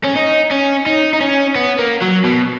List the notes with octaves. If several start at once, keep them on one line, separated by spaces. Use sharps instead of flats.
C#4
D#4
C#4
D#4
D#4
C#4
B3
A#3
F#3
B2